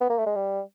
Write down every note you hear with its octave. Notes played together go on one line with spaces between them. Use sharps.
B3
A#3
A3
G#3
G3